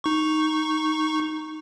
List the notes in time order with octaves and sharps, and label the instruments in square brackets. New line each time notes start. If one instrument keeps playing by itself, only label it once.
[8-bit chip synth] D#4 C#6